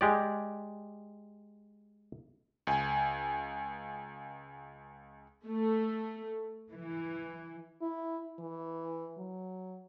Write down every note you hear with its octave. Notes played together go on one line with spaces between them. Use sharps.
G#3 G4 D5
C#2 G#5
A3
E3
E4
E3
F#3